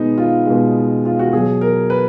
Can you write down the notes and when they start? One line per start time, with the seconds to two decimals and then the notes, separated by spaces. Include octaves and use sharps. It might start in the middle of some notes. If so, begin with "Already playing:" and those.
Already playing: B2 G#3 B3 D#4
0.18 F4
0.46 B2 G#3
1.05 F4
1.19 F#4
1.33 B2 F#3 G#4
1.61 A#4
1.90 B4